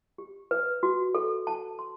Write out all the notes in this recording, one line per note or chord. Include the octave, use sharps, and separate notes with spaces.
G4
B4
F#4
A4
A5
C6